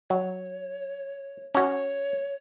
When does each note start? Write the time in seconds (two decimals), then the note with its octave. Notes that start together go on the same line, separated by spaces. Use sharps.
0.10 F#3 C#5
1.55 C#4 F#4 C#5